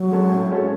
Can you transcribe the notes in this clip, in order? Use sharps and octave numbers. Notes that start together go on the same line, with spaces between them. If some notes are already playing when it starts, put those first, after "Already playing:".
Already playing: F#3
G#3 C#4 F#4 A4
A2
G#3 C#4 F#4 A4